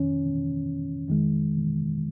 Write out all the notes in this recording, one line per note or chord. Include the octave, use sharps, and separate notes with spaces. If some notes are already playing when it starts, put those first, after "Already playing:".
Already playing: F2 D#3 C#4
F2 D#3 G#3